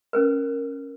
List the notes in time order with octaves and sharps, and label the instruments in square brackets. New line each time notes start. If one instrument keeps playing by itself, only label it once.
[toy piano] C#4 A#4 B4